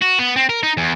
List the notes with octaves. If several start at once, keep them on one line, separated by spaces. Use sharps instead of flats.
F#4
B3
C4
A#4
D#4
E2